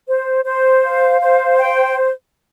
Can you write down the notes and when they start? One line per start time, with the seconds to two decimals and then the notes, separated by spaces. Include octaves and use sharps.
0.07 C5
0.45 C5
0.83 F5
1.21 C5
1.60 G5